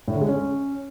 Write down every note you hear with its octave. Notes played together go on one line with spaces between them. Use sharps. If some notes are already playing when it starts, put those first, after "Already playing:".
A2
D3
G#3
C#4